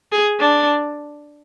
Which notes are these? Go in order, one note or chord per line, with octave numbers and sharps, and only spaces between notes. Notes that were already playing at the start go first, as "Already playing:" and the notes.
G#4
D4